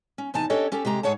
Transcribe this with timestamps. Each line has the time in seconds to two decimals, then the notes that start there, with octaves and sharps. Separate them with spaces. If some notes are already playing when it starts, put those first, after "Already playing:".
0.18 C#4
0.34 E2 C3 D#4 G#5 A5
0.50 C#4 D4 G4 A4 C#5 D#5
0.72 C#4 G4 A4
0.85 C3 G#3 G4 A#5
1.03 G#2 G#4 C#5 F#5 A5